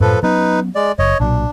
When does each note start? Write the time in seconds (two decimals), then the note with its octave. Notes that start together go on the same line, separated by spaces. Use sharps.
0.01 F#2 A2 F3 A4 B4
0.23 F#3 B3 C#4 D#4 B4
0.75 G#3 D5
0.99 F#1 C#5 D#5
1.20 B1 A#2 F#3 D4